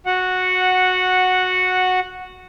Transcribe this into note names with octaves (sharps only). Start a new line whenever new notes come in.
F#4 F#5